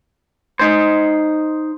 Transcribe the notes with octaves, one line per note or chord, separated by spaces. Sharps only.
D#4 C5